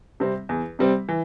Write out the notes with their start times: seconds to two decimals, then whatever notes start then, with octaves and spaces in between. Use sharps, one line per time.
0.20 C3 G3 C4
0.49 E2
0.79 C3 G3 C4
1.09 E3